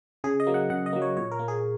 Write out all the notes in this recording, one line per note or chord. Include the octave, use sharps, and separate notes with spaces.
C#3 G#4
D#5
F#3 A#3
F#5
C#3 F#5
D#5
F#3 A#3
C#5
A#2 C#5
A#4
A#3
G#4